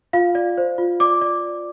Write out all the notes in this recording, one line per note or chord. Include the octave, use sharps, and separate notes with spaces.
F4 F5
D5
C5
F4
D5 D6
D5